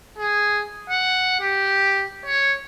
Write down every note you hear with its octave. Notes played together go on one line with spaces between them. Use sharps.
G#4
F#5
G4
C#5